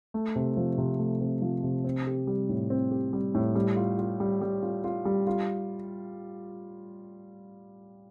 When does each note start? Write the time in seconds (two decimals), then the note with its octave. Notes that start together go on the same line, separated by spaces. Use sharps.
0.14 A3
0.36 C3
0.57 F3
0.78 C3
0.99 A3
1.21 C3
1.42 F3
1.63 C3
1.84 C4
2.07 G4
2.27 G3
2.49 A2
2.70 C4
2.91 G4
3.13 G3
3.34 A2
3.55 G3
3.76 F4
3.99 F4
4.20 G3
4.41 G3
4.62 F4
4.84 F4
5.05 G3
5.27 F4